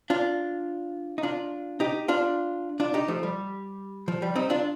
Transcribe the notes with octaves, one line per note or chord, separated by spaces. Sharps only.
D4 F4
D#4
D4 F4
D#4 G4
D4 F4
D4 F4
D#4 G4
F3 A3
G3
F3
G3
C4 D#4
D4 F4